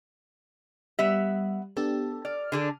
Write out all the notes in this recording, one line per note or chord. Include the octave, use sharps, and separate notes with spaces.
G3 B3 E5
B3 D4 G4 A4
D5 F6
D3 D4 G#4